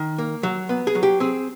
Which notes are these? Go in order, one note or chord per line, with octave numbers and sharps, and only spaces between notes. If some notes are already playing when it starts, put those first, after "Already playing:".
Already playing: D#3
A#3
F#3
B3
G#4
F#3
G4
C4 G#4